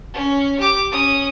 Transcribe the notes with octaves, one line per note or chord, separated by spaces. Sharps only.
C#4
G4 D6
C#4 D#6